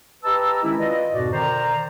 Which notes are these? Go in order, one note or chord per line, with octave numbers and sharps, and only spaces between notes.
G4 B4 D#5 A5 A#5 E6
D#3 G#3 C#4 E4
F4 B4 D5 D#5
F2 G#2 B2 F#4 D5 D#5
B2 D3 D#3 C5 D5 A#5